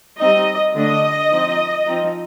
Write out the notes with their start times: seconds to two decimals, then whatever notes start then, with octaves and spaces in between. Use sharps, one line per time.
0.19 G3 C4 D#4 D#5
0.75 D3 A3 D4 D#5
1.31 F3 C4 D#4
1.87 F3 C4 D#4